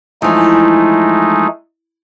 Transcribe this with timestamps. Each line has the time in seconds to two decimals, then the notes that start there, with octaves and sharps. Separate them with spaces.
0.22 E3 F3 G#3 A3 D#4